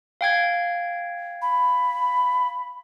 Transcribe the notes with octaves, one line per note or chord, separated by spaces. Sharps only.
F5 G5 G#6
B5